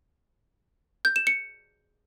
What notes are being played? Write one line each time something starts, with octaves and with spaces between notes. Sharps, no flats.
G6
E7
C#7